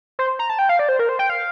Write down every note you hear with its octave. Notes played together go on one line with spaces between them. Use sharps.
C5
A#5
A5
G5
F5
D5
C5
A#4
C5
G5
F5